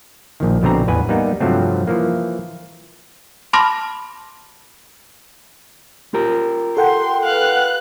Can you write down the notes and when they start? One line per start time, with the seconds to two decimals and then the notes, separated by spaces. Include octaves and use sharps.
0.40 A#1 A#2 D#3
0.62 A#1 B2 D3 C4 A#5
0.88 A1 E2 B4 G#5
1.09 G3 A#3 B3 D#4 A#4
1.40 G2 C3 F3 F#3 A3 C4
1.87 E3 F3 A#3
3.53 A5 B5 C6 D6 F6 A#6
6.14 F4 G4 A#4
6.77 A4 F#5 G5 C6
7.24 B4 F5 F#6